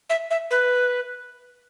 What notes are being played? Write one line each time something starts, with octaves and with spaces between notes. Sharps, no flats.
E5
E5
B4